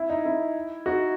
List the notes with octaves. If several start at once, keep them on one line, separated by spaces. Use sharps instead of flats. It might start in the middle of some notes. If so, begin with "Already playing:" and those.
Already playing: E4
D#4
E4
D#4 F#4